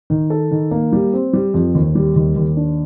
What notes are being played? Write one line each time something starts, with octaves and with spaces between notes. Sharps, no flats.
D#3
A4
D#3
A#3
G3
C4
G3
F2
D#2
G3
D#2
D#2
D4